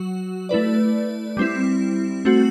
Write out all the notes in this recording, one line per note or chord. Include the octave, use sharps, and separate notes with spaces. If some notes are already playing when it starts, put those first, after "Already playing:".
Already playing: F#3 F#4
A3 E4 B4 D5
G3 C4 E4
A3 C4 F#4